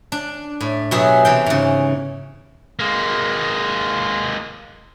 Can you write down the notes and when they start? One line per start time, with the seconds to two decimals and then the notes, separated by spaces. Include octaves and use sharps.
0.12 D4
0.60 A2
0.91 B2 F#3 G4 G#4 E5
1.25 C3 E3 G5
1.46 G#2 C#3
2.79 G#3 A#3